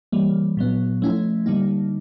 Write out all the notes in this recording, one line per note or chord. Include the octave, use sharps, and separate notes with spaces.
E3 G3 A#3
A#2 F#3 B3
F3 A3 C#4 E4
D3 G3 A#3 D#4